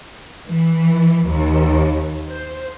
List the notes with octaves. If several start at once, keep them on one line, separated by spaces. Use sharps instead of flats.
E3
D#2
C5